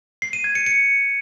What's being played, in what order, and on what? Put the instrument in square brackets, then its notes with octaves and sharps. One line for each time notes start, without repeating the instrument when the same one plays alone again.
[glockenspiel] C7
D#7
G#6
C#7
C#7